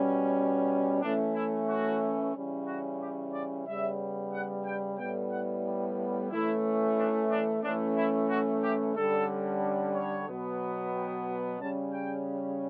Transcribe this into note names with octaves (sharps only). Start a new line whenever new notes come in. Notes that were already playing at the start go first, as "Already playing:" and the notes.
Already playing: B2 G3 C#4
E3 A3 C#4 D4
E4
F#4
C#3 E3 G3 C#4
F#4
G4
D5
C#3 G3 B3 E5
F#5
G5
A2 G3 B3 G5
F#5
E3 A3 C#4 E4
D4
D4
E3 A3 C#4 D4
E4
F#4
G4
D3 G3 C#4 A4
C#5
B2 F#3 B3
G5
C#3 G3 C#4 A5
G5